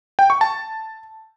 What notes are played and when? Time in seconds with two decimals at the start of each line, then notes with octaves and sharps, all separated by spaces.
0.19 G5
0.30 C#6
0.41 A5